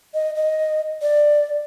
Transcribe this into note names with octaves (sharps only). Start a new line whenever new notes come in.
D#5
D#5
D5